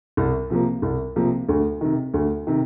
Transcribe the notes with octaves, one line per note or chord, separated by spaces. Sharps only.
C2
C3 F3 A#3
C2
C3 F3 A#3
D2
C3 D#3
D2
C3 D#3